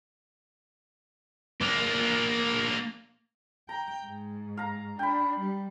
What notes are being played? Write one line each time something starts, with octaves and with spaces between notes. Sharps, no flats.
A#3 D4
G5 A#5
G#2
F5 A#5
D4 G5 B5
G3